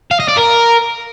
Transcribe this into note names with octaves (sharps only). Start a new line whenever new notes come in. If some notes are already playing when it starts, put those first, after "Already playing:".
F5
D#5
D5
A#4